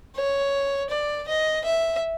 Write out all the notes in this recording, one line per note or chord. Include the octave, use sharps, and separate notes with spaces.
C#5
D5
D#5
E5